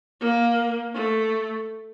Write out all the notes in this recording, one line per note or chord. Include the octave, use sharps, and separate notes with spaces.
A#3
A3